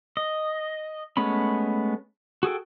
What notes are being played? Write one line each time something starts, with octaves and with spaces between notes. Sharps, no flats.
D#5
G#3 A3 B3 C#4 B5
F#4 G#4 A4 G5